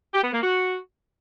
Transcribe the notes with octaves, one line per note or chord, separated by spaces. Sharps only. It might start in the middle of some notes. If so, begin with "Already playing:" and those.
G4
B3
A#3
F#4